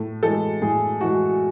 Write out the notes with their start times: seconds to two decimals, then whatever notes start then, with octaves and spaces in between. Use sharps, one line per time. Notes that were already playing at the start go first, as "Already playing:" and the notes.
Already playing: A2
0.23 E3 G#3 A4
0.62 A2 G#4
1.01 E3 G#3 F#4